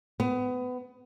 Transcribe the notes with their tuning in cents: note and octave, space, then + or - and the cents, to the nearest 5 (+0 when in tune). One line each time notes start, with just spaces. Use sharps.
B3 +25